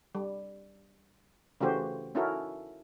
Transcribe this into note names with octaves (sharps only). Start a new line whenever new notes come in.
G3
C#3 E3 A3 F#4 G4 C5
C#4 D#4 E4 F#4 A4 A#4